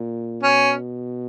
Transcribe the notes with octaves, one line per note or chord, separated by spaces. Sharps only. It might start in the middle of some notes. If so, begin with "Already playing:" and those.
Already playing: A#2
B2 C#4